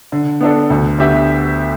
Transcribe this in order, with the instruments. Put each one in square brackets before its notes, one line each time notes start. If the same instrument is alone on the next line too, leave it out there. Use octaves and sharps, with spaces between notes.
[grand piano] D3
B3 D4 A4
D2
D3 B3 G4 E5